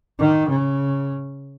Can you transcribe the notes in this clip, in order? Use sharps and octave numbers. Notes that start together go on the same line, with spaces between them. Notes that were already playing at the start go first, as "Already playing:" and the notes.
D#3
C#3